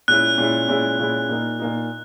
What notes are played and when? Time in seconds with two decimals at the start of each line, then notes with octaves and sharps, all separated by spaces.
0.08 A#2 G#3 C#4 E4 F#6
0.38 A#2 G#3 C#4 E4
0.68 A#2 G#3 C#4 E4
0.99 A#2 G#3 C#4 E4
1.29 A#2 A#3 D#4
1.59 A#2 A#3 D#4